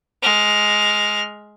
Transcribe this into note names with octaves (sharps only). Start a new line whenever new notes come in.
G#3 F6